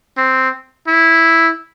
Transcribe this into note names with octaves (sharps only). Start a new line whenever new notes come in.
C4
E4